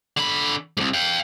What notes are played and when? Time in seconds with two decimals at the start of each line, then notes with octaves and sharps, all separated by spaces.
0.17 D3 B5
0.77 C2 G#2
0.94 F5 G5